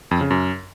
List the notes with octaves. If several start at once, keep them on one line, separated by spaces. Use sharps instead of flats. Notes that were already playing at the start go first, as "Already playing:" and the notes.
F2
C#3
F#2